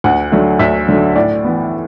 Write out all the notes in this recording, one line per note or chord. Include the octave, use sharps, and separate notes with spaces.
D2 F#5
D3 F#3 A3
D2 E5
D3 F#3 A3
A2 D5
E3 B3